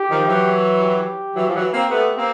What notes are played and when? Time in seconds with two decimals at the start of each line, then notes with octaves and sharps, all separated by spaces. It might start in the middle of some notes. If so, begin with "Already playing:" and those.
Already playing: G4
0.10 D#3 F3
0.28 E3 F#3
0.82 G4
1.36 E3 F#3
1.48 F3
1.54 E3 F#3
1.72 A#3 C4
1.89 A3 B3 G4
2.16 A#3 C4